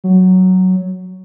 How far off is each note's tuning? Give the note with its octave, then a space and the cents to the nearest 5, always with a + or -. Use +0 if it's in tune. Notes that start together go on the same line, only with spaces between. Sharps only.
F#3 +5